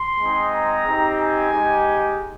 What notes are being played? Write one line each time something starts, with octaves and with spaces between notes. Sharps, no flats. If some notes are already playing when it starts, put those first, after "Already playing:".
Already playing: C6
G#3 C4 D#4
A#5
C4 D#4 G4
G#5
G#3 D#4 G4